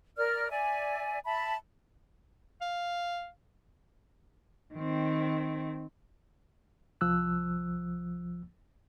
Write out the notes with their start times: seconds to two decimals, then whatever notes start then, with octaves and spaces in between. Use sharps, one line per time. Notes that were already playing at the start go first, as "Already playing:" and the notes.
0.17 A#4 D5 F6
0.50 D5 E5 G#5
1.24 E5 A5 B5
2.61 F5
4.75 D#3 C4
7.01 C2 F3 E6 F#6